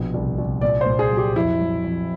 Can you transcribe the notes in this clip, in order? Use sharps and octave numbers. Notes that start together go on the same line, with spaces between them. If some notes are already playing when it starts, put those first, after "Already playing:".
Already playing: A#1 B2
C2
C2
A#2 D5
A#2 C5
G#4
F#3
G4
F2 E4
F#3
F2